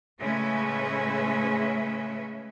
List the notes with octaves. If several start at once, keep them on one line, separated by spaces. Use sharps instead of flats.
A2 C#3 G#3 C#4 B4 E5